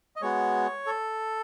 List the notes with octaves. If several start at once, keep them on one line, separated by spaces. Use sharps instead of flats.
D#5
G#3 B3 F#4 C#5
A4